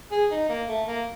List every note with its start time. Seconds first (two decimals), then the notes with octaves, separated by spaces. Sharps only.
0.12 G#4
0.31 D#4
0.49 A#3
0.68 A3
0.87 A#3